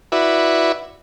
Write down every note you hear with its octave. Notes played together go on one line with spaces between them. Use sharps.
E4 F#4 B4 D5 E5